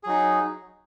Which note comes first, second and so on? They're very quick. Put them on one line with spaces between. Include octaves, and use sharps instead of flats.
G#4 F#3 D#4